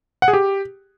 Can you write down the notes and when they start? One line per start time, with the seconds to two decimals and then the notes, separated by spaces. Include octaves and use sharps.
0.22 F#5
0.28 G#4
0.33 G4